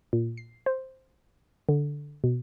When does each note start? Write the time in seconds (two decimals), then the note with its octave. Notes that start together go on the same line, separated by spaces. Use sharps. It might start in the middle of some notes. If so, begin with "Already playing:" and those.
0.13 A#2
0.37 C7
0.66 C5
1.69 D3
2.24 B2